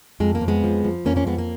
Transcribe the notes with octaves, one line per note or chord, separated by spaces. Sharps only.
F2 G#3
A#3
F2
G#3 B3
F3
F3
F2 A#3 C#4
A#3 C#4
F2 G#3 B3
A#3